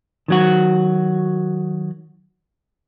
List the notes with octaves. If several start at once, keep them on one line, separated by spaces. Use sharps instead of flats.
D#3 F#3 F#4